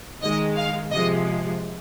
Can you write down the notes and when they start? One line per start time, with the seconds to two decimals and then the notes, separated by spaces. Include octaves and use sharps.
0.23 D#3 G#3 D#5
0.57 F5
0.92 C3 F3 G#3 D#5